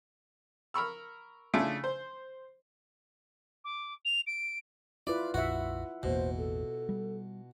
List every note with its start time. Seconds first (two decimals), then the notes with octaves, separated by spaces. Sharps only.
0.74 A#4 B5 C#6 E6
1.54 C#3 A3 D4 E4 F4
1.84 C5
3.64 D6
4.05 F7
4.26 D7
5.07 E4 F4 B4 D5
5.34 A#1 F2 A#2 F#4 E5 F#5
6.03 A1 E2 B2 A#3 C5
6.37 A4
6.89 G3